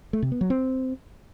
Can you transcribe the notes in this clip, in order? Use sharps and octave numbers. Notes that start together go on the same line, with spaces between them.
A3
C3
B3
F#3
C4